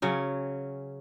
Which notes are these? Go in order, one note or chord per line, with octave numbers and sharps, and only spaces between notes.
C#3 F#3 C#4